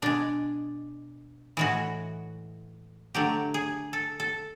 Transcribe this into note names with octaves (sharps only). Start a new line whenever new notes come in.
B2 G#3 D4
A2 E3 G#3 F#4
D3 F#3 A3 G4
G#4
A4
A4